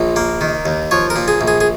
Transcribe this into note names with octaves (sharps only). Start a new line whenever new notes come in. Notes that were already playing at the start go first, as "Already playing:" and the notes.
Already playing: A#1 A#2
A#3
D#3
D#2
F3 C#5
A#4
A#2
G#4
A#1
G#4
G#4